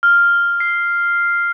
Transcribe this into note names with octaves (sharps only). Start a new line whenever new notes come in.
F6
C7